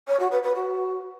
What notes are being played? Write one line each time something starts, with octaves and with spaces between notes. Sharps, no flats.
C#5
F#4
B4
B4
F#4